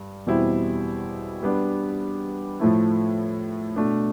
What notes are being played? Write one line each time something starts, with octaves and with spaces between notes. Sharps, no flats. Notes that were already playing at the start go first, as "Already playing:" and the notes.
Already playing: G2
E2 B2 G3 C4 E4
G3 B3 D4
A2 F3 A3 E4
B2 A3 D4